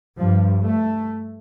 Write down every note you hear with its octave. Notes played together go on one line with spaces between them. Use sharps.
G2 F3
A3